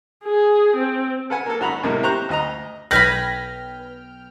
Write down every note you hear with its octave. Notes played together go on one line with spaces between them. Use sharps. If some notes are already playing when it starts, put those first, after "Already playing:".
G#4
C4
A4 B4 F#5 G#5
A#3 A4
G#1 F#4 A#5 B5
E2 A2 C3 G#3 A#3
G4 C5 A#5 C#6 F#6
D2 D#5 A#5
B1 B4 G5 G#5 B5 F6 A#6